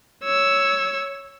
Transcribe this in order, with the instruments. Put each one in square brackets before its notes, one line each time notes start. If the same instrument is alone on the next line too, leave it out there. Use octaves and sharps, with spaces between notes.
[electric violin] C#5 E6